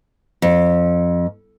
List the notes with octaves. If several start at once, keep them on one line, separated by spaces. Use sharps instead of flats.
F2